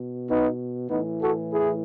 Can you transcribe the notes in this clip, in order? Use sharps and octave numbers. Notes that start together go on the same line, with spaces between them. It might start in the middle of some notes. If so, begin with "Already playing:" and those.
Already playing: B2
B3 D#4
A2 E3 B3 D#4
F#4 A4
E4 G#4